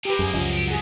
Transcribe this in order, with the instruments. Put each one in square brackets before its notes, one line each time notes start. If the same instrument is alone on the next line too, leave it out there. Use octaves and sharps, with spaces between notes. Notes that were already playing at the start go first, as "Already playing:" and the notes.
[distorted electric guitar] C3 A#3 [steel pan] G4 B4
[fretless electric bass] F#2 [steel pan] G#4
[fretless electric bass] C#2 F#2 F3 [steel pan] D#5
[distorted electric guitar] C3 G4
[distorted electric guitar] G2 [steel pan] G#4 F#5